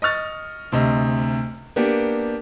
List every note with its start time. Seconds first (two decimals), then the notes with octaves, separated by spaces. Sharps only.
0.02 D#5 C#6 F6 A6
0.72 D2 C3 D#5
1.76 A#3 B3 D4 G4